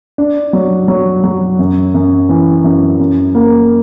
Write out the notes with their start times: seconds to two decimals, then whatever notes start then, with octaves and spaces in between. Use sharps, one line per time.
0.18 D4
0.53 F#3
0.88 F#3
1.24 F#3
1.59 F#2
1.94 F#2
2.29 E3
2.64 F#2
3.00 F#2
3.35 A#3